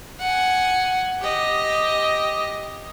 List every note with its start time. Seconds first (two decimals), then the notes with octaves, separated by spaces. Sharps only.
0.19 F#5 G#5
1.20 G4 D#5